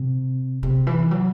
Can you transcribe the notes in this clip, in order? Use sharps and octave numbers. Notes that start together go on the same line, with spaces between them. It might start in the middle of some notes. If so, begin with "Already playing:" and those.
Already playing: C3
C3
E3
F#3